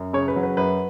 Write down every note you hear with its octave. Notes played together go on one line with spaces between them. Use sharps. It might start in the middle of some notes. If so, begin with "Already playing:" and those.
Already playing: F#2
C#3 C#5
B4
F#3
B4
F#2 B4